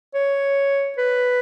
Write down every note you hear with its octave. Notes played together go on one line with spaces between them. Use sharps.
C#5
B4